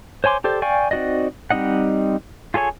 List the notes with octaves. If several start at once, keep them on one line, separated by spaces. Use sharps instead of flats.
C5 C#5 G#5 C6 D6
G4 A4 C5 D5
D5 F5 G5 G#5 C#6
C4 D#4 F#4 D5 D#5
G3 C4 D#4 D#5 F#5
F4 G#4 A4 C#5 G#5